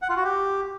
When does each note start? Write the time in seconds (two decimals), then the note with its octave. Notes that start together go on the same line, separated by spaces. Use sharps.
0.02 F#5
0.09 F4
0.17 F#4
0.24 G4